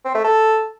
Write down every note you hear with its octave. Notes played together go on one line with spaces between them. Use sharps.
C4
A3
A4